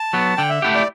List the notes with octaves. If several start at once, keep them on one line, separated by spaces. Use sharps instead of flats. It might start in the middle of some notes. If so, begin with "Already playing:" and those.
Already playing: A5
F#3 B3
D3 G5
E5
A3 E4 G4 F#5
D5